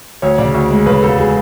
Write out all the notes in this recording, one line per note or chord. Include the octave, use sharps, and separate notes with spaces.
D2 C#5
C#3 D5
D2
G#3
C#3 B4
E1 A4
G#4